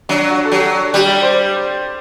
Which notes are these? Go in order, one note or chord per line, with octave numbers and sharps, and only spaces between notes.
F#3 D4
F#4
A4
F#3 G4
G3 G4
D5
C5